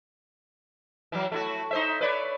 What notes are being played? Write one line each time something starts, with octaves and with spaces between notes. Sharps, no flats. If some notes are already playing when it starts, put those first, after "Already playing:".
E3 F#3
A3 E4 F#4
D#4 C5 E5
B4 C#5 D5